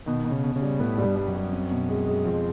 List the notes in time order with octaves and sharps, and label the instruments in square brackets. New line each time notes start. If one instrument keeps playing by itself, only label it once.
[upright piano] B2 [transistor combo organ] D#3
[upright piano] B2
[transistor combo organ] C#3
[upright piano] B2
[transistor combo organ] C#3
[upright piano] G3
[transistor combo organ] A2 [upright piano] B3
[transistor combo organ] G#2 [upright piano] G3
[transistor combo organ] G2
[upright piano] G3
[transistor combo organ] F#2
[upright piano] G3
C4
B2
G#3
G#3
[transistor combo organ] F2 [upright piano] G#3